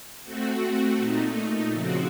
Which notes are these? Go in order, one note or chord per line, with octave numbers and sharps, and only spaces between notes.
A3 C4 F#4
A#2 A3 D#4
C#3 F3 C4 F#4